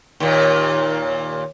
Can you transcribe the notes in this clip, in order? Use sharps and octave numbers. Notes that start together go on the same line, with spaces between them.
D#2 A#2